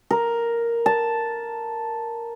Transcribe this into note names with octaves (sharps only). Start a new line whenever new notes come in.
A#4
A5